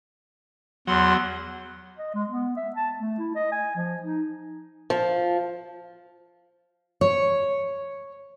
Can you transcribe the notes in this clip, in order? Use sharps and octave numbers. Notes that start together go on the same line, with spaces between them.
E2 F#3 C6
D#5
G#3
B3
E5
A5
A3
E4
D#5
G#5
F3
D#4
F3
C#5